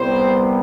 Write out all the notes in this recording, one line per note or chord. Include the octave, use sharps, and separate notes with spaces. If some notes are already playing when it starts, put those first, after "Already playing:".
Already playing: C2 C3 G3 B3 C5